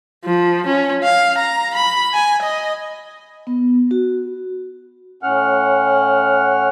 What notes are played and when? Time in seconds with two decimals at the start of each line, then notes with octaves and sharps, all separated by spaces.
0.25 F3
0.67 C#4
1.04 F5
1.38 A#5
1.75 B5
2.13 G#5
2.43 D#5
3.47 B3
3.91 F#4
5.23 A2 C#4 F#5 F6